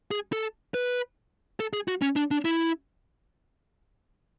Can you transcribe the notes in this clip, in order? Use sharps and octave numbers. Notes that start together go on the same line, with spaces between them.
G#4
A4
B4
A4
G#4
F#4
C#4
D4
D4
E4